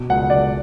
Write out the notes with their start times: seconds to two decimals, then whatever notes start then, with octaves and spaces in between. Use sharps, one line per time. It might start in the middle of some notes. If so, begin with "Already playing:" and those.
Already playing: B2
0.10 C#2 F#5
0.30 C#2 D5